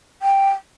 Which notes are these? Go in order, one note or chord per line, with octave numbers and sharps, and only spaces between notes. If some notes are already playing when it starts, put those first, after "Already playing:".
G5